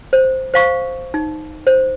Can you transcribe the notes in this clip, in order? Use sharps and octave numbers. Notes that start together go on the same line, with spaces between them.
C5
C5 F5 C#6
D#4
C5